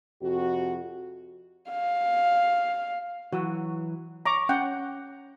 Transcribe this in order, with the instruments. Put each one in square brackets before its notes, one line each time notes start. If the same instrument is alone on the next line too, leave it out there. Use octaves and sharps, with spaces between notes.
[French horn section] F2 C3 F#4
[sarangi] F5
[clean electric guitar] E3 F#3 [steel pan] F#4
[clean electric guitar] C#5 [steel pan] A#5 D6
[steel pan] C#4 F#5 G5